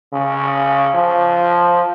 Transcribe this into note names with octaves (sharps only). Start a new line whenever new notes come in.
C#3
F3